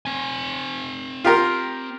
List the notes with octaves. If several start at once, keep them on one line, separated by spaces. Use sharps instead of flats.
C4 G#5
F4 G4 A#4